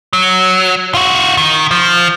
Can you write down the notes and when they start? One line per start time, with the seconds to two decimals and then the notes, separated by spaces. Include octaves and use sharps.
0.13 F#3
0.94 F4 F#4
1.37 D#3
1.71 F3